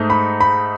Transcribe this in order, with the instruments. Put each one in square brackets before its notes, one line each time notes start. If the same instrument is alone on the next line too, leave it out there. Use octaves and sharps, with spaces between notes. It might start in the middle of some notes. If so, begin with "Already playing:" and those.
Already playing: [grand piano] G#2 A3 D#4
B5
B5